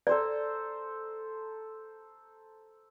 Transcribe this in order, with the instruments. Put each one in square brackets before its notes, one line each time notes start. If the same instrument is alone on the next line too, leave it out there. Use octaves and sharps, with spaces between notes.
[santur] A4 C5 A#5 [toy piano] D5